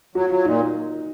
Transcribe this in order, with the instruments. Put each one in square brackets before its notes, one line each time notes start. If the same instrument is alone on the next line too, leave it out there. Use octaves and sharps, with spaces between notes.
[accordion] F#3 [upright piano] F#4
[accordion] F#3 [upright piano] F4
[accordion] A#2 [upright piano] D#4